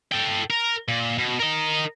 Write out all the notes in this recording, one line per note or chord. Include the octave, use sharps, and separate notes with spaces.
A4 G5
A#4
A#2
B2
A#4 D#5